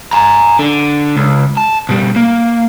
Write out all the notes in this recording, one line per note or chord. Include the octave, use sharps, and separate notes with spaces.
G#5 A#5
D3
C#2
A5
B2 G3
A#3